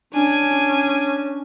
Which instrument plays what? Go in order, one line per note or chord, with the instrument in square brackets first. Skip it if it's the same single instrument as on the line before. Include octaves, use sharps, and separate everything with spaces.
[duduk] C#4 [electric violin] D4 G#5